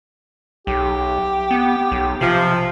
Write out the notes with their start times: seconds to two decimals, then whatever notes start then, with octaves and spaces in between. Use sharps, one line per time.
0.67 B1 G4
1.51 B3
1.92 B1
2.21 C3 F3